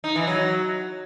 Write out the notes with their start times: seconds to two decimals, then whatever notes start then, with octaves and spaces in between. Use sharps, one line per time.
0.04 D#4
0.16 E3
0.27 F#3